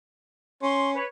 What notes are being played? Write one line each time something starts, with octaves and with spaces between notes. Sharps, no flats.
C#4 C6 C#6
B4 C#5